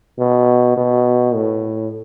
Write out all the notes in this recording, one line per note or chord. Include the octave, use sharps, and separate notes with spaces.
B2
B2
A2